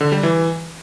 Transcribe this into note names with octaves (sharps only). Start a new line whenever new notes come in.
D3
G3
E3